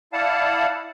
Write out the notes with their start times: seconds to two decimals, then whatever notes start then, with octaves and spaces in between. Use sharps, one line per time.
0.13 E4 D5 F5 F#5 A5